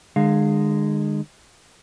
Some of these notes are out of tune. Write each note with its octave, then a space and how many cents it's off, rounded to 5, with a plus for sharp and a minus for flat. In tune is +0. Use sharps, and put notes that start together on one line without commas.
D3 +45 G#3 -10 F5 +10